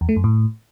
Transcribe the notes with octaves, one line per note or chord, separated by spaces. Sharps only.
E2
A3
F#2
A2